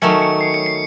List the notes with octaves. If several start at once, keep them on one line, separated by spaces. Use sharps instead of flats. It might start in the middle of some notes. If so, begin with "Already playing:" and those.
D#3 F#3 A3 C#4 C#7
C#7
C7
C#7
C7